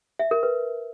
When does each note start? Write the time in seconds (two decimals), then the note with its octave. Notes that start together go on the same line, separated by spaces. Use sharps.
0.19 E5
0.31 A#4
0.43 B4